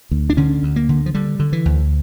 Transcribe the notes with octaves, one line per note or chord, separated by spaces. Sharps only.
D2
D4
D3 C#4
D2
A#3
D3
F3
D3 G3
D3
E3
D2